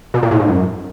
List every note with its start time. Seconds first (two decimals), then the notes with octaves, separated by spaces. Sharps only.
0.14 B2
0.23 A#2
0.31 A2
0.40 G#2
0.48 F#2